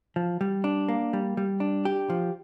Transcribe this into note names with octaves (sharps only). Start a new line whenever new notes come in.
F3
G3
D4
A#3
G3
G3
D4
G4
F3